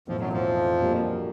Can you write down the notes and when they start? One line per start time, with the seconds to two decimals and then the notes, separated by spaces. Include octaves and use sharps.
0.08 B1 F2 A2 E3 F3
0.20 F#2 F#3
0.33 F2 F3
0.81 A#2 G3 A#3 D4 F#4